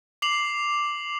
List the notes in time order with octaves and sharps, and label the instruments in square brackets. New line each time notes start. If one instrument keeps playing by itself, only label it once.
[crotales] D6 C7 F7 F#7